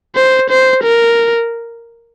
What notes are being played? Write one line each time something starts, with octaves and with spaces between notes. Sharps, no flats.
C5
C5
A#4